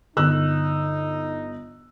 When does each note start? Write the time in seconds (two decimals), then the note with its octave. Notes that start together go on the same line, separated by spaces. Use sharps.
0.17 G1 D#4 E6 F#6